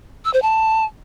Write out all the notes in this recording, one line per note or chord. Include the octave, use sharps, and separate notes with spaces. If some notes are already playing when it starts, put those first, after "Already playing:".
E6
C5
A5